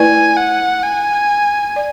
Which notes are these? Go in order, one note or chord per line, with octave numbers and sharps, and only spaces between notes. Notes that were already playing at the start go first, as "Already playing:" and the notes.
Already playing: A3 E4 B4 D5 G#5
F#5
G#5
D5